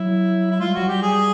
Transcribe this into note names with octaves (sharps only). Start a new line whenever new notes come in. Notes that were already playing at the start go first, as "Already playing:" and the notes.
Already playing: F#3 E4
E4
G#3 F4
G3
F#3 F#4
G3 G4
G#4